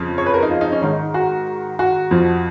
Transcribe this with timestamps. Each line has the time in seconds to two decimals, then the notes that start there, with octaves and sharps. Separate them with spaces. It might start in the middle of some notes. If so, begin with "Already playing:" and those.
Already playing: F2 C#3 F3
0.18 C#5
0.26 B4
0.34 A#4
0.43 D#4
0.50 F4
0.61 D#4
0.72 C#4
0.82 G#2 D#3 D#4
0.93 D#4
1.14 F#4
1.79 F#4
2.11 F2 F3